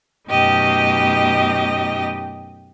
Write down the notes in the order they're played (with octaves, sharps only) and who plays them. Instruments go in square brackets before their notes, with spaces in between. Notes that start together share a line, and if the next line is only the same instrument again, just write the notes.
[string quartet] F#2 B2 A3 D#4 G4 D#5